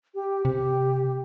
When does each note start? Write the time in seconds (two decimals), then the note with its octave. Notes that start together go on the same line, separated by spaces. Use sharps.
0.15 G4
0.45 C3 G4